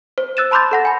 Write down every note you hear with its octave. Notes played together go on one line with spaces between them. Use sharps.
C5
E6 F#6 A6 D#7 E7
A5 B5 C6 D6 G6 A6
A4 F#5 A#6
G#5 B5